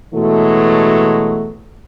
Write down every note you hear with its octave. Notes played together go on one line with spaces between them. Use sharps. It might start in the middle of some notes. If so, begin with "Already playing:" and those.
B2 E3 F#3 G#3 A3